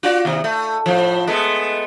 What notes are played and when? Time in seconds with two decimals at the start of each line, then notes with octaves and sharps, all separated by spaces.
0.03 F4 F#4 D5
0.25 D#2 C3
0.44 A3
0.86 A2 F3
1.27 G#3 A3 B3